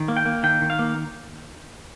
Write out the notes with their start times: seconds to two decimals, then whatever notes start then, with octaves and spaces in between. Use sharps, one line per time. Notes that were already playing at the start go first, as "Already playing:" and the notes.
Already playing: D#3
0.08 A#3
0.17 G5
0.26 A#3
0.43 D#3 G5
0.61 D#3
0.70 F5
0.79 A#3